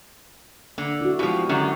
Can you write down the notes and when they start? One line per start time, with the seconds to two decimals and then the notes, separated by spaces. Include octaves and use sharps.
0.78 D3 A#3
1.01 E4 F#4
1.19 B2 F3 G#3 G4
1.49 F#2 D3 D#3